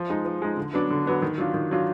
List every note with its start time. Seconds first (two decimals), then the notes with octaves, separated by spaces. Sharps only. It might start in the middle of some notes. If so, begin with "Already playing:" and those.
Already playing: F3
0.10 G#3 D#4
0.25 F3
0.42 G#3 D#4
0.57 D3
0.73 F#3 B3 D4
0.90 D3
1.06 F#3 B3 D4
1.22 D#3
1.38 F#3 D4 F4
1.54 D#3
1.71 F#3 D4 F4